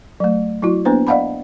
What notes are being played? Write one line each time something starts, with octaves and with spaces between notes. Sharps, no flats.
F#3 A3
F#3 E4 F#4
A#3 B3 D4 B4 C5
D5 D#5 F5 F#5 A5 B5